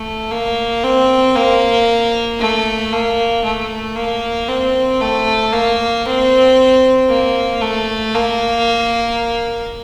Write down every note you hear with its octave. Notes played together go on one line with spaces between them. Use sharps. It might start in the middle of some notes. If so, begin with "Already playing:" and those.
Already playing: A3
A#3
C4
A#3
A3
A#3
A3
A#3
C4
A3
A#3
C4
A#3
A3
A#3